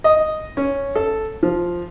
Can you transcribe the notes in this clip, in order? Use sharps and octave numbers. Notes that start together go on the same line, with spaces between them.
D#5
C#4
A4
F3